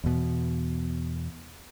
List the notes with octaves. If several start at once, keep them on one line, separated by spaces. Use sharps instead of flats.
E2 B2